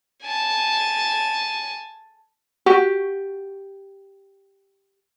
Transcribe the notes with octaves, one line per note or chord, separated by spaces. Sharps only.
G#5 A5
F#4 G4